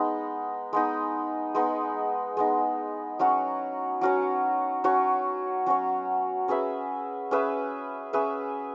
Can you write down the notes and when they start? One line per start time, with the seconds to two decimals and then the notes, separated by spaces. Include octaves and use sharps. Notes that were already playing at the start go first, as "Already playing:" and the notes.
Already playing: G#3 B3 D#4
0.73 G#3 B3 D#4
1.55 G#3 B3 D#4
2.37 G#3 B3 D#4
3.19 F#3 C#4 F#4 C#5
4.01 F#3 C#4 F#4 C#5
4.84 F#3 C#4 F#4 C#5
5.66 F#3 C#4 F#4 C#5
6.48 C#4 G#4 B4 E5
7.31 C#4 G#4 B4 E5
8.13 C#4 G#4 B4 E5